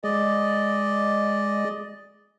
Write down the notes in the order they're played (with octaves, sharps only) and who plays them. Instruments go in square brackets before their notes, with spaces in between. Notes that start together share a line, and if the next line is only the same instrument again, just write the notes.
[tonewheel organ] G#3 [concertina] D5 D#5